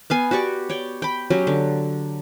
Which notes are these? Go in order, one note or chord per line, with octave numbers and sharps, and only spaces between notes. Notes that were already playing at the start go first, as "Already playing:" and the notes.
B3 F5 G#5
F#4 G4 D5 C#6
C#5 D5 G5
G5 B5
F#3 C#4 G4
D3